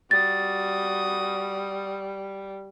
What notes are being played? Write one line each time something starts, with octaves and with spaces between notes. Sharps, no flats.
G3 F#4 D#6 A6